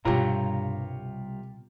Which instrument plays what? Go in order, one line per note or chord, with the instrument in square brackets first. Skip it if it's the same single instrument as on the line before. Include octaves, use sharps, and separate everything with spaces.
[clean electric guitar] C2 C#5 A#5 [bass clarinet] G2 [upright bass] B2 G3 [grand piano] F4 G4